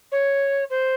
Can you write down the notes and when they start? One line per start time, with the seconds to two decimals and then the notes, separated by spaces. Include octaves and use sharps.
0.11 C#5
0.70 C5